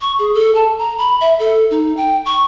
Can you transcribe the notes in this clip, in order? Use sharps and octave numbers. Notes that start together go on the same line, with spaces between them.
C#6
G#4
A4
A5
A#5
B5
E5
A4
D#4
G5
C#6